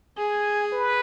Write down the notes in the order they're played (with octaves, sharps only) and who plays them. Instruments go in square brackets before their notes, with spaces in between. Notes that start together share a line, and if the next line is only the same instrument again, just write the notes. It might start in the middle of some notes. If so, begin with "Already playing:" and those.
[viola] G#4 [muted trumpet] G#5
[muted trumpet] B4